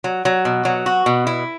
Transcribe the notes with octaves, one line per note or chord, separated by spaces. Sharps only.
F#3
F#3
B2
F#3
F#4
B2
E4